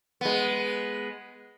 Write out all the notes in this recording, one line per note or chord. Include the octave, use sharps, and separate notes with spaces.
G#3 B3